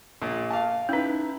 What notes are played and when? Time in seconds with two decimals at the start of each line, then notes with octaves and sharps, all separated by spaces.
0.21 A#1 A#2
0.51 F5 A5
0.89 C#4 D#4 E4 B4